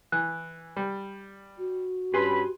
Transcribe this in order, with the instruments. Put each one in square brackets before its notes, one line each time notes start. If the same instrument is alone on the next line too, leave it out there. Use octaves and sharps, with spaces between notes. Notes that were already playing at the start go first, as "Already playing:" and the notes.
[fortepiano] E3 [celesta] F#6
[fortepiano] G3
[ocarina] F#4
[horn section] G2 C#4 B5 [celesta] G4 [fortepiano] B4 G#5 C6